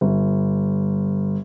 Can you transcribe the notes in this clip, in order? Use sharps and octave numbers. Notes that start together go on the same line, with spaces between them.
G1